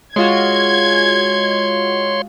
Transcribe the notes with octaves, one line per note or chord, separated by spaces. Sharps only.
G#3 F4 F#4 C#5 C6 G#6